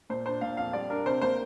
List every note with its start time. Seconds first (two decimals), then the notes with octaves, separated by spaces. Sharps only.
0.10 A#2 C5
0.26 D4 C5
0.41 A#2 F5
0.57 F2 F5
0.73 G3 D5
0.90 D4 A#4
1.06 C3 C5
1.21 A#3 C5